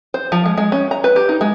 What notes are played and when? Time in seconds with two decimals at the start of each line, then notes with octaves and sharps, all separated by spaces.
0.14 C5
0.32 F3
0.46 G#3
0.57 G#3
0.72 C#4
0.91 A#5
1.04 B4
1.16 G4
1.29 D#4
1.41 G#3